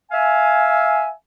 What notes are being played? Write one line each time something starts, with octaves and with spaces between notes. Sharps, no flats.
E5 F5 G#5